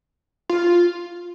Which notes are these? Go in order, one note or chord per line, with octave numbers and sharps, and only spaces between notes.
F4